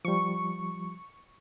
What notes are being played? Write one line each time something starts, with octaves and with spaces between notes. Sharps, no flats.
F3 G3 C#6